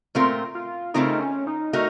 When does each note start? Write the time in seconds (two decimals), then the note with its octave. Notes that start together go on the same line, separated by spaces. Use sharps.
0.15 A#2 A3 C4 F4 A#4
0.55 F4
0.94 C#3 A3 C4 D#4 F4 A#4
1.20 C#4
1.47 D#4
1.73 A3 D#4 F#4 A#4